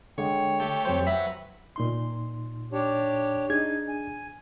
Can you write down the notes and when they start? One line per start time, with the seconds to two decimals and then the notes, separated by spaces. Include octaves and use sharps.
0.18 D3 G#3 C#5 G5
0.60 A3 G4 C#5
0.85 F2 F#3 C5
1.07 F#3 B4 E5
1.76 A#2 D#4 C6
2.73 D4 G4 C#5
3.50 D4 D#4 G#4 G#6
3.88 G#5